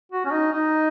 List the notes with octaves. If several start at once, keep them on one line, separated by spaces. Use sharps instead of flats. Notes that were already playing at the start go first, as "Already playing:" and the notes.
F#4
C#4
D#4
D#4